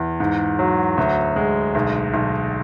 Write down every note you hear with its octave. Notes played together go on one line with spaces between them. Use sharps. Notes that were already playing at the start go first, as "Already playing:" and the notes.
Already playing: E2
G#2
F#3
D2
G#3
B1
B1